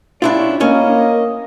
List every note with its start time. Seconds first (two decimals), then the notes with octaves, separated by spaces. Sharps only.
0.22 C#4 D4 E4 F4 G4 C#5
0.61 A#3 C#4 D#5